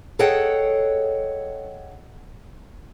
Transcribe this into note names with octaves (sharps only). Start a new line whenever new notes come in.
G#4 A4 C#5 D#5 F#5 G5